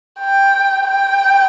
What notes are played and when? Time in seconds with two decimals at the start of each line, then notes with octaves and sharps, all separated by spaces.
0.20 G5
0.88 G5